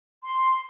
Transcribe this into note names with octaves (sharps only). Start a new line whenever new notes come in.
C6